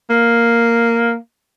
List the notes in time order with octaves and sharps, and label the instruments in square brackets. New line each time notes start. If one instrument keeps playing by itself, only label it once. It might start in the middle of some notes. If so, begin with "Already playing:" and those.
[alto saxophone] A#3